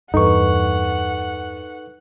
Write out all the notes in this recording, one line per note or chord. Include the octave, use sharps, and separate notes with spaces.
E2 G2 D#4 A4 B4 F#5 C#6